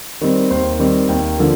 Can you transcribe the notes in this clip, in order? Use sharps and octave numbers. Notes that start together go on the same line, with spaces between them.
D#3 G3 C4
D#2 C5
D#3 G3 C4
D#2 G5
D3 F3 A#3